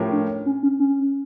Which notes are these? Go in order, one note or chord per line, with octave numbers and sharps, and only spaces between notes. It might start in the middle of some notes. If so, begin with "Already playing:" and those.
Already playing: A2 F3 C#4 G4 A#4
D4
C#4
C#4
C#4